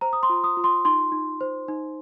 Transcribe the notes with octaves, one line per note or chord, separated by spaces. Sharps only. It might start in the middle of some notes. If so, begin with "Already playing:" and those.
C5 A#5
D#6
C6
F4
D#6
F4
C6
D#4 C6
D#4
C5
D#4